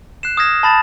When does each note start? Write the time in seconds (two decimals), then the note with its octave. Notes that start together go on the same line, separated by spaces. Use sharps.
0.23 F#6 C7 E7
0.37 D#6 F6 G#6 A#6 E7
0.63 A5 B5 A6 E7